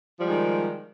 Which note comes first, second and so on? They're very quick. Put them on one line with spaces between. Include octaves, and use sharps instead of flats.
F3 G3 G#3 D#3